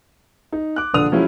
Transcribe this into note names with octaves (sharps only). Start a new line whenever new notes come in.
D#4
D6 F#6
A#1 D3 D4 A4 D#6 F7
F3 F#3 G#3 C#4 E4